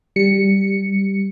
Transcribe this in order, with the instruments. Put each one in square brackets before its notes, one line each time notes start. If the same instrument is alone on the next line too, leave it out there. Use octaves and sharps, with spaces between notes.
[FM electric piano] G3 C#7